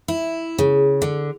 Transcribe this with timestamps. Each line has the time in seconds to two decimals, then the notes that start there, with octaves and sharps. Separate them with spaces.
0.08 E4
0.58 C#3
1.02 D3